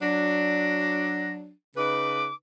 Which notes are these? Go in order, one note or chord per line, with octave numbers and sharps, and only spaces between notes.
F#3 D4 A#6
C#3 D#4 B4 D6